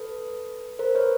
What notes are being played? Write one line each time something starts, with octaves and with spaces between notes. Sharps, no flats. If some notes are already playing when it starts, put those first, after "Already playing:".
Already playing: A4 B4
A#4 C5
B4 C#5